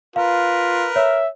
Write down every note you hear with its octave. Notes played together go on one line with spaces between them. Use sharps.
F4 A#4 B4 F5
C#5 E5